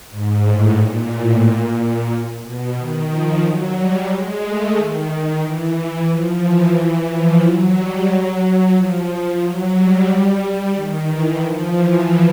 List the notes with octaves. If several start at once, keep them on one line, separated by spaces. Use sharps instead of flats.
G#2
A2
A#2
A2
A#2
B2
D#3
F3
F#3
G3
G#3
A3
D#3
D#3
E3
F3
E3
F3
F#3
G3
F#3
F3
F3
F#3
G3
D#3
E3
F3
E3